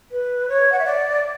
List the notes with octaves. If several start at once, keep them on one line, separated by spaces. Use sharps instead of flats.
B4
C#5
F#5
E5
D5